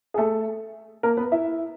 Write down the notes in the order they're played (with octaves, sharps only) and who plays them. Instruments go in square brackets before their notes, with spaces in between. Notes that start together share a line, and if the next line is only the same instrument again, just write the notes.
[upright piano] G#4
A3 A4
A#3 A#4
B3 B4
E4 E5